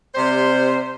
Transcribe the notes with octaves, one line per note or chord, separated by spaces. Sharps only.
C3 G3 C5